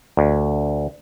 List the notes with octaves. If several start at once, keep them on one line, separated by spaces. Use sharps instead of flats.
D2